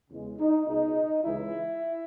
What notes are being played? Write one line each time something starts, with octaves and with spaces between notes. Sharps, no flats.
E2 C#3 E3 G#3
D#4
C#2 B2 G#3 D#4
C#2 C#3 E3 G#3 E4